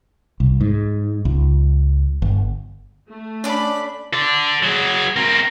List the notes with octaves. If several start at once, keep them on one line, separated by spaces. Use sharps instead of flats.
C2
G#2
C#2
G1
A3
C#4 D4 D5 B5
A4 D5
F#3 G#4
C4 A#4